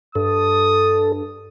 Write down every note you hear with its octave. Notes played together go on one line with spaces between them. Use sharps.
G2 A4 D#6